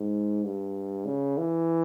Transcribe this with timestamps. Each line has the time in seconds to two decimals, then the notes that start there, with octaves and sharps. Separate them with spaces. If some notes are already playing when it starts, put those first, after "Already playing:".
Already playing: G#2
0.45 G2
1.06 C#3
1.38 E3